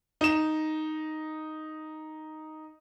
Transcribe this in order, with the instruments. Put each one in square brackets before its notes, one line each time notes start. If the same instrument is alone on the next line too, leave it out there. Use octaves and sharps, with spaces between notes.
[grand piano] D#4 E7